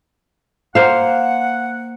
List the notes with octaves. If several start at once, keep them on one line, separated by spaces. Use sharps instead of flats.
A#3 C5 F5 F#5